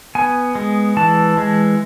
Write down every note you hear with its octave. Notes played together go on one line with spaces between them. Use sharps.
B3 G#5
G#3
E3 A5
G#3